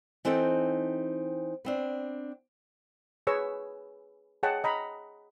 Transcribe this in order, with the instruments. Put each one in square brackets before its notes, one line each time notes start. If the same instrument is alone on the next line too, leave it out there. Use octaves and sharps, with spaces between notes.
[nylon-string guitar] E3 C4 D#4 A4 C5 G5
B3 C4 D4
[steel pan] G#4 B4 C#5 E6
G#4 C#5 D#5 F#5 G5 A5
D#5 A#5 B5